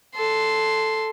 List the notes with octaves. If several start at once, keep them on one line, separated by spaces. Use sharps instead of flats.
A4 C6